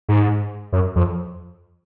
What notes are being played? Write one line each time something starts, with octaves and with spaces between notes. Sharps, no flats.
G#2
F#2
F2